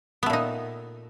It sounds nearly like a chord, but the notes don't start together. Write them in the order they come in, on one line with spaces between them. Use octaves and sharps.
B3 A3 A#2 D#4